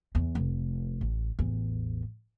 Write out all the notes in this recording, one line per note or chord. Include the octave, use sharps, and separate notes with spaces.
E2
F1
A1
A1 E2